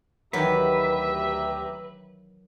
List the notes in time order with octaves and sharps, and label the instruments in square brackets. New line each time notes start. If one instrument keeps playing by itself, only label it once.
[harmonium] D2 G4 A#5 [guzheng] D#3 E3 F#3 [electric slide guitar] B4 [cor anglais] E5